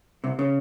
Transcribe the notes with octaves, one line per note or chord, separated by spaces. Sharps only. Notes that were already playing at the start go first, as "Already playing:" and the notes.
C2 C3
C#3